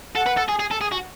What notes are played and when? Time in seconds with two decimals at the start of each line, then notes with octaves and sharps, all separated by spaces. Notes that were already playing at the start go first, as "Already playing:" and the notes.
0.16 A4 F#5
0.27 B4
0.37 A4
0.49 G#4
0.60 G#4
0.71 A4
0.81 G#4
0.92 F#4